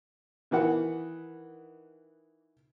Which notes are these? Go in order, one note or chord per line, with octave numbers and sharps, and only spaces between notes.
D#3 E3 B4 F#5